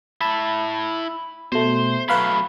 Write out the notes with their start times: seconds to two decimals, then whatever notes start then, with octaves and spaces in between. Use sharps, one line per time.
0.21 E4 A5 B5
1.52 B2 A3 C5
2.08 F#3 A3 B4 F5 B5